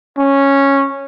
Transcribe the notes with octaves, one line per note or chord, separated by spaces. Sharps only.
C#4